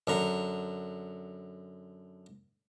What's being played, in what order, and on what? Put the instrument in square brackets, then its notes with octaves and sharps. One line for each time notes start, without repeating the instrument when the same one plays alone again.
[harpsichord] F#2 D3 A#5